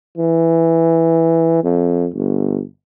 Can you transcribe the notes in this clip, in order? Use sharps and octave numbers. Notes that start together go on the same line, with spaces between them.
E3
F2
G1